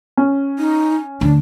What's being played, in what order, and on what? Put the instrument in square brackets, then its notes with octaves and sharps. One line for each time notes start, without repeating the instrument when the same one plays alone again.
[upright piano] C#4
[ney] D#4
[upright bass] D2 [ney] D4